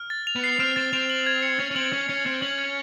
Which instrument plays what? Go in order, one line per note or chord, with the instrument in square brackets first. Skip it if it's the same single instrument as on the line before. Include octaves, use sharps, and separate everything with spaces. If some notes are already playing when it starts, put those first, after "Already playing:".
Already playing: [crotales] F6
A6
F7
[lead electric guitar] B3
[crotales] C7
[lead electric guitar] C4 [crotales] F6
[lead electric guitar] C4 [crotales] A6
[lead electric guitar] C4 [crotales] F7
[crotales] F#7
G#6
C#7
[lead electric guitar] C#4 [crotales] G#6
[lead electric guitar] C#4
[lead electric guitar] C4 [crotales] F#7
[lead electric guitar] C#4 [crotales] G#6
[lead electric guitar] C#4 [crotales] C#7
[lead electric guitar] C4 [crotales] G#6
[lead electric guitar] C#4 [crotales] F#7
[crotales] G#6